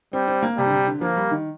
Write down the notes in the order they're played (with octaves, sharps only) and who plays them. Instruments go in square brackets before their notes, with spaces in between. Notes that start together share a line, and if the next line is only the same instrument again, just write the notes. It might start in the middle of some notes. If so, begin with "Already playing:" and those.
[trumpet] G3 [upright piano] C4
[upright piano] C4
A#3
[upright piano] C3 [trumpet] G3
[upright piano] D3
C3
D3
[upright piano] F3 [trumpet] A#3
[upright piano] G3
D#3